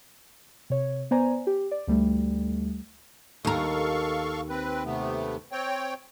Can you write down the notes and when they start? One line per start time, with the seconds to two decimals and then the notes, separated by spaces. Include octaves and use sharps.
0.70 C3 C#5
1.11 B3 C5 D5 G#5 A#5
1.47 G4
1.71 D5
1.88 D2 G3 A3
3.45 D#2 A4 A#4 F5 C#6
4.50 C4 B4
4.85 C3 A3 B3
5.52 C4 C#5 G5